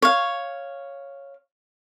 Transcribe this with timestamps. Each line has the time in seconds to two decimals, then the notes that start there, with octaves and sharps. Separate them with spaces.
0.02 C#5 F5